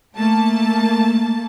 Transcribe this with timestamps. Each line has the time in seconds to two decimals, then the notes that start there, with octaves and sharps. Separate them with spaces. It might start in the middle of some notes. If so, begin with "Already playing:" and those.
0.17 A3 A#3 A5